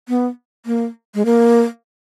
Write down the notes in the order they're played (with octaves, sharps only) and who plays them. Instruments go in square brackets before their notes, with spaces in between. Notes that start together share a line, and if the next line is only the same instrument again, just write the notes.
[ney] B3
A#3
G#3
A#3